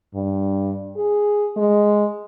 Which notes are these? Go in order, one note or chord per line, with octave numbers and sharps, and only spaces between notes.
G2
G#4
G#3